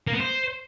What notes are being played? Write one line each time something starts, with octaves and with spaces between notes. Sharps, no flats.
A#3
B3
C5